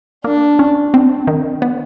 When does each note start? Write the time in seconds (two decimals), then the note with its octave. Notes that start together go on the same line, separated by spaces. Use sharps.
0.24 A#3 D4
0.59 C#4
0.94 C4
1.27 D#3
1.62 B3